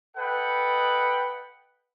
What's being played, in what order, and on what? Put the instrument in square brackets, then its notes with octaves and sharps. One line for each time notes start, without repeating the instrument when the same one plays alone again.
[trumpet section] A4 B4 D#5 F#5 G5